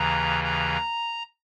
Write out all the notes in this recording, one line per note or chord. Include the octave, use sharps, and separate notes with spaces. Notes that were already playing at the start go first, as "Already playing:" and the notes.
Already playing: D#2 C#3 E3 A#5
A#5